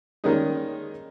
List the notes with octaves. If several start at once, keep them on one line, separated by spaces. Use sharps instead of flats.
D#3 G3 G#3 A#3 C#4 D#4